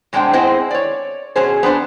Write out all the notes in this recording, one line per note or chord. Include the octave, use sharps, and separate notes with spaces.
B2 G#3 C4 D4 G5
B3 C4 E4 G#4 C5 D#5
C#5 D5
B2 F#3 C#4 G#4 C5
B3 C4 D4 C5